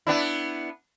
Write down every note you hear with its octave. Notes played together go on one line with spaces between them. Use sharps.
B3 D4 E4